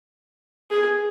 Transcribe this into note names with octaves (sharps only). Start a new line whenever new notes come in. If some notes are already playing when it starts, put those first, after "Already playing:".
G#4